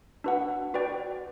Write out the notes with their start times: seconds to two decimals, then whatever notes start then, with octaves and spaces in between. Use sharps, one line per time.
0.24 D4 F#4 B4 F#5
0.74 F#4 B4 D5 G5